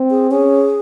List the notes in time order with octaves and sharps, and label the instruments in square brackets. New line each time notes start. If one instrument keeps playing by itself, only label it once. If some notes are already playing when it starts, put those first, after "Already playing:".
Already playing: [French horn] C4
[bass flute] G#4
[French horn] C#4 [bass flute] G#4